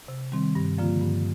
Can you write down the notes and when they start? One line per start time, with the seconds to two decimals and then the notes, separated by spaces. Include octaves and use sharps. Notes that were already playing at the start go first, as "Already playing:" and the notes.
0.08 C3
0.32 D#3 G3 C4
0.55 G2
0.78 D3 F3 A#3 F4
1.02 G2